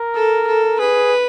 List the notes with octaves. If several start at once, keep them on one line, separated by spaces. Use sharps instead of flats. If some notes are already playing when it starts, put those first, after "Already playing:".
Already playing: A#4
A4
A4
G#4 B4